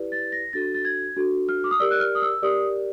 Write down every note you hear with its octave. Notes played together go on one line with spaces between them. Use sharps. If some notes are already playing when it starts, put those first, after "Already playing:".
Already playing: E4 G4 B4 D5
A6
A#6
D4 F#4 A4 A6
A6
G#6
D4 F#4 A4
F6
D6
D#6
G4 A#4 D5 E6
F#6
F6
D#6
E6
G4 A#4 D5 D#6